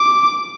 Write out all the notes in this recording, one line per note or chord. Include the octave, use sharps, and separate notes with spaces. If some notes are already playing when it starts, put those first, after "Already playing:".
Already playing: D6